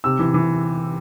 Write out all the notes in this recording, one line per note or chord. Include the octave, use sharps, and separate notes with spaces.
C3 E6
E3
E3